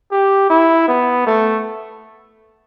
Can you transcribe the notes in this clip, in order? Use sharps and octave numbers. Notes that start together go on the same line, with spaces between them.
G4
E4
B3
A3